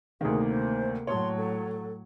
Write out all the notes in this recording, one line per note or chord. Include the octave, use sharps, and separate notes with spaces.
D2 C3 D#3 A#3 G#4
C5
A2 F#3 C#5 A5 C6
A4